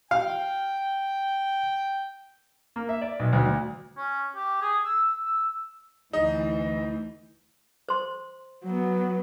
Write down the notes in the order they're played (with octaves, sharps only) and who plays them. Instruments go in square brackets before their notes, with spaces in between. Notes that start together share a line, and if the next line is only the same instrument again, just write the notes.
[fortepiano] F5 [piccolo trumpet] G5
[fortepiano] A#3
E5
D5
B1
D2
D2
[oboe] C#4
G4
G#4
E6
E6
[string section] D2 E3 [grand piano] D#4
[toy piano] C5 C6
[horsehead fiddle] F#3 B3